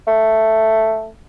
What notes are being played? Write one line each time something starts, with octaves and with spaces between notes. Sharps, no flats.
A3